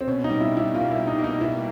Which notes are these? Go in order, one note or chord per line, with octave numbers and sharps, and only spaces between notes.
C4
B2 C#4
G3 D#4
E4
B2 E4
A#3 F4
E4
G3
D#4
A#3
D#4
B2 E4